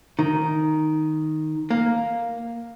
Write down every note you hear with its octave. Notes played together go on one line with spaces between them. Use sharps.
D#3
A#3